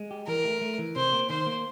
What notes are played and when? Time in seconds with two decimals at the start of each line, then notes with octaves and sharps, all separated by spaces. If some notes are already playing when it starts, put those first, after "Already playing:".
Already playing: G#3
0.11 G4
0.27 E3 A#4
0.44 A3
0.61 A3
0.78 E3
0.96 C3 C5
1.13 A#3
1.29 D#3 C5
1.47 A#3